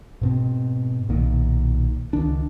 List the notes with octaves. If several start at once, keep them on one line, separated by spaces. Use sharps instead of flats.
G#2 B2 C4
B1 A#2 D#3
C#2 D#3 D4